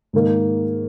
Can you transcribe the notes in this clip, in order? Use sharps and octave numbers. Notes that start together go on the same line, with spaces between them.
G#2 D#3 A#3